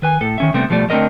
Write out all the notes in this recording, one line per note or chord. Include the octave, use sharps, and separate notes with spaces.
D#3 B4 G#5
A2 A4
D#3 C#4 E5
C3 G3 A3 B3 C4
B2 F3 G3 A3 D5
D3 A3 C4 D4 A#4 D#5